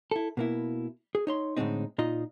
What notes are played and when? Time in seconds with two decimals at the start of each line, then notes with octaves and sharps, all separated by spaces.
0.11 E4 A4
0.37 B2 A#3 E4
1.15 G#4
1.27 D#4 C#5 C6
1.57 A2 D3 E3 G#3 C4 D#4
1.98 A#2 D#4 F4 D#5